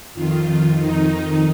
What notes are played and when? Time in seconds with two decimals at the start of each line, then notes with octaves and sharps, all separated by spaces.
0.14 F2 D#3 F4
0.79 F2 D#3 D#4